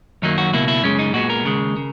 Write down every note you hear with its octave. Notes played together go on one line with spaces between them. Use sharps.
F#2 D#3 F#3 A#3 D#4
F#4
C#2 B2 A#3 E4
E4
F#2 C#3 G#3 C#4
D#4
A#2 G#3 B3 F#4
A#4
D#2 C#3 G#3
C#3